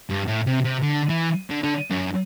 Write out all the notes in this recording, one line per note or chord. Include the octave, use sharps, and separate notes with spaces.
G2
A2
C3
C3
D3
E3
D3
D3
F#2